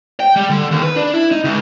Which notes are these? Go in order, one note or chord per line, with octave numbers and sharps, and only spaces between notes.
G5
G3
D3
D#2
B4
D4
E4
D#4
C#2